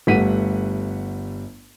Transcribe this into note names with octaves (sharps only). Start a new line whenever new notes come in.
G1 G3 A3 F#5 B6 D#7